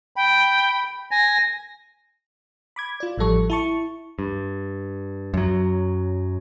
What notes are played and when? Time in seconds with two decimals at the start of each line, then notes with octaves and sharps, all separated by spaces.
0.16 G5 B5
1.11 G#5 A#6
2.76 B5 D6 G#6
3.00 F4 D5
3.18 A1 F3 G3 A4 C#6
3.50 E4 A5 C#6
4.19 G2
5.34 F#2 F#3